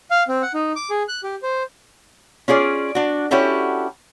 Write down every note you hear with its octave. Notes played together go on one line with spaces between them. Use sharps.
F5
C4
F#5
D#4
D6
G#4
F#6
G4
C5
C#4 F4 G#4 D5
D4 F#4
C#4 D4 E4 F#4 G4 A4